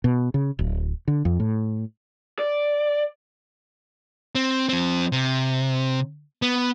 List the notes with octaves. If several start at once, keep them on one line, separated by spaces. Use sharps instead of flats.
B2
C#3
D1
D3
F2
A2
D5
C4
F3 C4
C3
B3